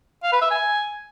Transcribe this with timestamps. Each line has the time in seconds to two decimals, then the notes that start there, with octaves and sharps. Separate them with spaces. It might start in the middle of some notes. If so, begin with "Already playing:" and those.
0.23 F5
0.32 B4
0.41 E5
0.51 G#5